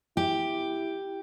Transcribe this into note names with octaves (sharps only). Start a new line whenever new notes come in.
E4 G4